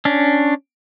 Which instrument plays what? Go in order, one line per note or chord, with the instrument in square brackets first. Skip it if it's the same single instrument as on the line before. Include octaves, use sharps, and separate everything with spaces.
[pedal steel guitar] C#4 D4